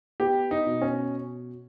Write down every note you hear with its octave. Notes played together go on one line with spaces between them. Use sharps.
B3 G4
D#4
B2
C#4